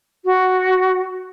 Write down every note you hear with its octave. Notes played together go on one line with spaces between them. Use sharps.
F#4